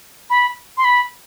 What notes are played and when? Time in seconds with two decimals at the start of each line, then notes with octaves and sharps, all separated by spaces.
0.30 B5
0.78 C6
0.85 B5